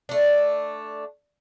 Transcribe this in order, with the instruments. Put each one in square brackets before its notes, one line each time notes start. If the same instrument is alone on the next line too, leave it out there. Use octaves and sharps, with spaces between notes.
[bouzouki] A3 D4